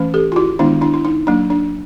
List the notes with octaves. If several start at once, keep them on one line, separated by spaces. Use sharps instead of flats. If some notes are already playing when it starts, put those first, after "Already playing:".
Already playing: E3 A3 C#4
G4 A4
F4
E4 F#4
D#3 G#3 B3 D4 E4
D4 E4
E4
D#4
F#3 A#3 D4
D4